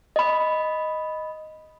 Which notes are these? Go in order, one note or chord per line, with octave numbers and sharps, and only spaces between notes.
D#5 B5